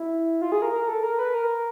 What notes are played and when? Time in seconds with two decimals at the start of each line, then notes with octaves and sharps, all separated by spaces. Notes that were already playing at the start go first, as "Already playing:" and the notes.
Already playing: E4
0.42 F4
0.52 G#4
0.62 A#4
0.72 A#4
0.88 A4
1.03 A#4
1.19 B4
1.34 A#4